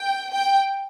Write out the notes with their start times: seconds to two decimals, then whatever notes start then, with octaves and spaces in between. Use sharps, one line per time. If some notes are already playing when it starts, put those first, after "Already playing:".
Already playing: G5
0.32 G5